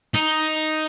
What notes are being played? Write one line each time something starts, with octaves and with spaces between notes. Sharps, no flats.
D#4